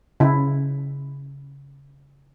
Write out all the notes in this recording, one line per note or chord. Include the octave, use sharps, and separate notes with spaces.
C#3 E4